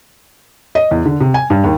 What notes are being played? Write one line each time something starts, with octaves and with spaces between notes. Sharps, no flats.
D#5
E2
D3
C3
G#5
G2
D#2